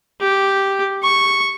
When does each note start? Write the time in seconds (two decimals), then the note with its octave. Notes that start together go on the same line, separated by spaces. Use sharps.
0.21 G4
1.03 C#6